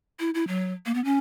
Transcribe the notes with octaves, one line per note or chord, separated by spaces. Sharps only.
E4
E4
F#3
A#3
B3
C#4